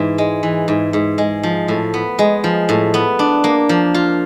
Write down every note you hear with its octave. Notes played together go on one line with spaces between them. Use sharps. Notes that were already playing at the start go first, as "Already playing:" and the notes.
Already playing: G#2 E3
G#3
E3
G#2
G#2
G#3
F3
A2
B3
G#3
F3
A2
B3
D4
A#3
F3
F4